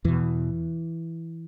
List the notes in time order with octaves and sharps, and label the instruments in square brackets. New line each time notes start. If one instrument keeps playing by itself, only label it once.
[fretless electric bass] E2 B2 E3